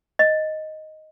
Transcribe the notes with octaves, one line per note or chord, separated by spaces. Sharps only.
D#5